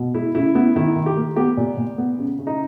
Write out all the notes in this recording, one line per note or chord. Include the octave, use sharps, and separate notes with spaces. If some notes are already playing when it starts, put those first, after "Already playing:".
Already playing: B2
G#3 E4
C#3 E4
B3 E4
D#3 E4
D#3
G4
A#3
B3 G4
A#2
A#2
B3
C#3
C#3
D#4